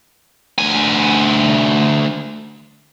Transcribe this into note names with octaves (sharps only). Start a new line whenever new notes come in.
D2 G#5